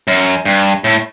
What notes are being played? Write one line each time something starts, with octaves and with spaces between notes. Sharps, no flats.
F#2
G2
A2